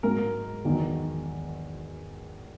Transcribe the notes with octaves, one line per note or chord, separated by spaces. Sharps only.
G#2 F#3 A#4
E2 D#3 F#3